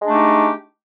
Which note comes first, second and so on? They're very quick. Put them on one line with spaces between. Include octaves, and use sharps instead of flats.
G#3 D4 A3 G4 D#4